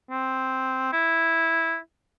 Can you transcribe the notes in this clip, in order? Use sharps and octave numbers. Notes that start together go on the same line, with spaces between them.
C4
E4